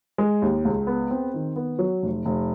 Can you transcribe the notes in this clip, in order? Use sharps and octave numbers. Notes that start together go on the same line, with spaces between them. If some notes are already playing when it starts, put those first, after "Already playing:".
G#3
D#2
C#2
B3
C4
D#3
B3
F#3
F1
F1